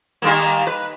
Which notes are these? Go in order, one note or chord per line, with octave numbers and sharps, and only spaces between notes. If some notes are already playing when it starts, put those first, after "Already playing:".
D#3 G3 A#3
B4